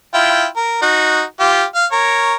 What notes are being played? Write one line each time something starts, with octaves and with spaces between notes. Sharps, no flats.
E4 F4 G5
A#4
D#4 F#4
F4 G4
F5
A#4 C#5